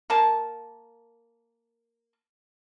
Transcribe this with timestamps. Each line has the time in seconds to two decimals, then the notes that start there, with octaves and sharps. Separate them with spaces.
0.10 A#3 A#4 A5